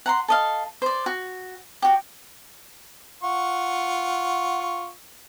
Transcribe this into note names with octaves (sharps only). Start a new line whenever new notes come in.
F#5 A#5 C6
A4 D#5 F5
C5 D5
F#4
F#4 G4
F4 F#5 C#6